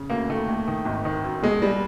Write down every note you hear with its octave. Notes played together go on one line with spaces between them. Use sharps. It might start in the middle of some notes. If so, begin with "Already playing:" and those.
Already playing: C#3
D2 A#3
D#3 A3
D#2
D#3
G#1
D#3
F#2
B2 G#3
G3